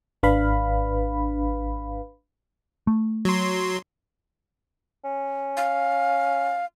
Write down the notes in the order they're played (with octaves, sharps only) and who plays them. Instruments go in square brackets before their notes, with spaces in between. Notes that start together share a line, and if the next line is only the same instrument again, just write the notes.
[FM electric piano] G#1 D4 B4 F5 B5
[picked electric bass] A3
[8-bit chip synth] F#3 C6
[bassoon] C#4
[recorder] F5